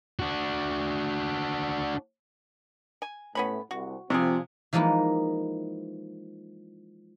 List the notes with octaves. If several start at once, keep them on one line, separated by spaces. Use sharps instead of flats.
D4 F#4
G#5
A2 B3 C#4 B5
C2 F#4
C3 F3 G3 C4 G4 G#4
E3 F3 G#3 A#3 D#4 E4